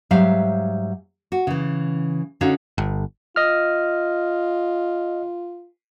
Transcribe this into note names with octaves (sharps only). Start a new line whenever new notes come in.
G#2 F#3 G3 E5 F5
F#4
C#3 E3
D3 C#4 D#4 F#4 C#5 F5
G1
F4 D#5 F6